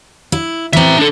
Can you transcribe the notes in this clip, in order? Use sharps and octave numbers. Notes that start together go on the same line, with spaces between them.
E4
E3 C4 E5 A#5
D4 A4